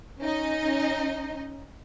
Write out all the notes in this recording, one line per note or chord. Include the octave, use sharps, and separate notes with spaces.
C#4 D#4 D#5